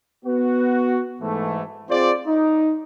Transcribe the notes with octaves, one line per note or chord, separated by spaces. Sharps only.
B3 F#4
G#2 E3 A3
C4 F4 G#4 C5 D5
D#4